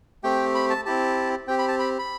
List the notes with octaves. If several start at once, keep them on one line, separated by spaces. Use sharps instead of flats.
A3 C4 G4 G5
B5
A5
C4 E4 G4 A5
C4 G4 G5
B5
A5
B5
B5